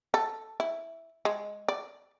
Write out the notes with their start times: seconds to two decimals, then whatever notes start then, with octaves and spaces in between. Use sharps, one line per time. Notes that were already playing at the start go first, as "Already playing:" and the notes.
0.14 A4
0.60 E4
1.25 G#3
1.69 D5